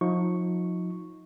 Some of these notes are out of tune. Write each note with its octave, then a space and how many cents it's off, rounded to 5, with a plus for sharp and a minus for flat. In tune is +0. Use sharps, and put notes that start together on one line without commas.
F3 +40 D#4 +25 C#6 +0